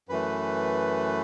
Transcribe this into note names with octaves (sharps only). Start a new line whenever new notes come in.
F#2 E3 A3 B4